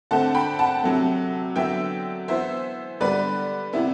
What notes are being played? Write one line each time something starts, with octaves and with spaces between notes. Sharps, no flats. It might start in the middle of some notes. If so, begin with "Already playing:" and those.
D3 A3 C4 F#5 A5
G5 B5
F#5 A5
C3 F#3 A3
D3 F#3 B3 E5 G5
E3 B3 C5 E5
D3 G3 B3 B4 D5
C3 E3 B3 E4